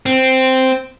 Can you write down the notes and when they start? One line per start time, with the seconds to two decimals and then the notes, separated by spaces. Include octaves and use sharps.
0.06 C4